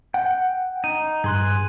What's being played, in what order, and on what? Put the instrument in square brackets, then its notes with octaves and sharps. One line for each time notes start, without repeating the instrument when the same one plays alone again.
[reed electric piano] F#5 [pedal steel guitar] G5
[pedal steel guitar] D#4 [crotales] D#7
[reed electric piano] G2 F#6 [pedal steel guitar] G#4 C6